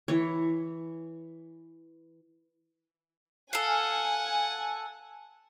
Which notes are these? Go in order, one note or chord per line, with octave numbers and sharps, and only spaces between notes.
E3 C#5
A4 F5 F#5 G#5